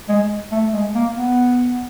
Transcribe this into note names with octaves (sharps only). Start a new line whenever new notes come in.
G#3
A3
G#3
A#3
B3